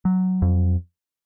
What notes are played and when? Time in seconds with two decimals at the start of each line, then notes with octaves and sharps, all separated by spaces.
0.05 F#3
0.42 F2